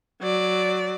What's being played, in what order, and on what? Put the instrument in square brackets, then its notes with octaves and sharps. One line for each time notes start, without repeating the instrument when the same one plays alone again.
[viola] F#3 D5